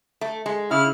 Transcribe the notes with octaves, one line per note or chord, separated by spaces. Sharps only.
A3
G#3
C#3 E4 F6